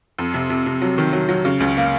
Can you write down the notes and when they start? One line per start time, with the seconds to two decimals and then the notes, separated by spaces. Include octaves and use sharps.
0.19 F2
0.34 C3
0.50 C3
0.66 C3
0.82 F#3
0.98 D#3
1.13 F#3
1.29 F#3
1.45 C#3
1.60 C#2
1.77 A#3